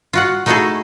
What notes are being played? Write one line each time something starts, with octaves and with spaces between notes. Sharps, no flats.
F4 F#4 F#5
A3 D#4 E4 F#4 G#4 A4